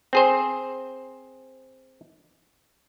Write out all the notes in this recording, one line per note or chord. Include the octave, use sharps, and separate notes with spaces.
C4 G#4 C5